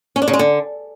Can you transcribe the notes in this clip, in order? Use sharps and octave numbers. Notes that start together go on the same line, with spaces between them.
C#4
D4
C#3
G#3
D3